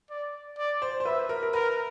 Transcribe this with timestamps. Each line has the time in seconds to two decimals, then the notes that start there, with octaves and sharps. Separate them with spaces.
0.10 D5
0.58 D5
0.82 C5
1.00 C5
1.06 B4 E5
1.29 A#4
1.43 A#4
1.54 A#4 B4